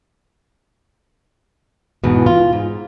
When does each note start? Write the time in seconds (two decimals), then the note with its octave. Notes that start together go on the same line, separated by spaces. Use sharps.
2.04 E2 G#2 B2
2.26 F4
2.53 G#2